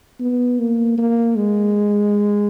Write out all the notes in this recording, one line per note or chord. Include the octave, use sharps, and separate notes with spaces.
B3
A#3
A#3
G#3